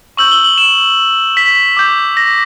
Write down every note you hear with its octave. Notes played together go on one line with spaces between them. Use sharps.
C#6 E6 G6 F#7
G7
F#7
E7
B6
D6 G6
A#6